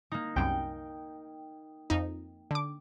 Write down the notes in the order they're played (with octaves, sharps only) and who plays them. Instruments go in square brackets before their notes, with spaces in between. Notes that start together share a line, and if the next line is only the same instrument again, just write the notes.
[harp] A#3 D#4
[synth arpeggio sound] C2 F#2 [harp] G5
[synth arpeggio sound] F2 D#4
D3 D6